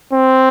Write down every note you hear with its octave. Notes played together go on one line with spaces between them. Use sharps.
C4